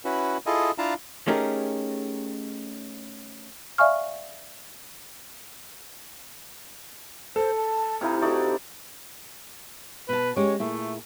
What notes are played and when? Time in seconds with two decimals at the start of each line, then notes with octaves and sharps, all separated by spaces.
0.05 C#4 E4 F#4 B4
0.46 E4 F4 G#4 A4 D#5
0.78 D4 E4 F4 F5 A5 A#5
1.27 A3 C#4 D#4 G4 G#4 A#4
3.78 D5 E5 F5 G#5 C#6 F6
7.36 A4 C5
7.57 A5
8.01 C3 D#4 E4 F5
8.22 A3 D#4 F#4 D5 C#6
10.09 B2 B4 A5
10.36 G#3 C#4 G4 C#5
10.59 A#2 A3 E4 G#4